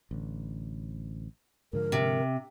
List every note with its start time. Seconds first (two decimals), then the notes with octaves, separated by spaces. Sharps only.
0.11 A1 D3
1.73 G#2 D3 F3 A#4
1.92 C3